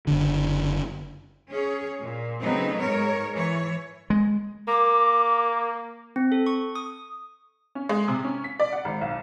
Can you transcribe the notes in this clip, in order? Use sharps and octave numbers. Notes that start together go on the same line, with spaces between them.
F#1 D3
C#4 G#4 C#5
A#2
C#3 F#3 A3 B3 C4 D#4
G#2 A#4 C#5
E3 C#5
G#3
A#3 D6
C4
A4
C#6
D#6
C#4
G#3
C3
C#4
B6
D5
F#5
G#1
B1